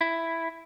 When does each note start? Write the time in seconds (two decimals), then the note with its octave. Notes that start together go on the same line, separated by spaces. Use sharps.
0.01 E4